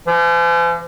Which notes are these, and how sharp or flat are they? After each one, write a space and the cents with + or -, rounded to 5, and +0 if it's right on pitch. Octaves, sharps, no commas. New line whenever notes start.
F3 -45